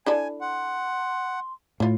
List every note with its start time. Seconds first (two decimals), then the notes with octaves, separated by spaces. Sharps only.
0.06 D4 E4 A4 G#5
0.41 F#5 C6
1.80 A2 E4 F4